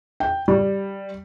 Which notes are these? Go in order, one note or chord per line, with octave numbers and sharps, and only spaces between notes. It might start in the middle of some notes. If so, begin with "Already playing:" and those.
G5
G3